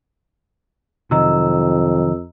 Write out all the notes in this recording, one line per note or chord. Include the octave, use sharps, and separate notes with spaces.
F2 C3 D#3 F#3 D#5 A#5 E6